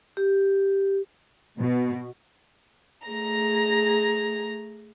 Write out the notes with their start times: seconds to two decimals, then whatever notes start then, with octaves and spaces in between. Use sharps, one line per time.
0.17 G4
1.59 B2
3.07 A3 G#4 A#5 A#6